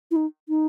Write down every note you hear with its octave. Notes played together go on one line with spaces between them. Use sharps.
E4
D#4
D#4